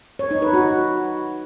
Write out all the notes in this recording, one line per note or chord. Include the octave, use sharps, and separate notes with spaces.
C#5
D#4
B4
F#4